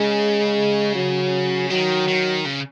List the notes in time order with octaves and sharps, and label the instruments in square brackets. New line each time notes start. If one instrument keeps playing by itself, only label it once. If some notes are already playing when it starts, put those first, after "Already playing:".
Already playing: [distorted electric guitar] C#3 [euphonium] G#3
[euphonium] F#3
[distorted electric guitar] D#3 [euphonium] F#3
[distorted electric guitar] D#3
C#3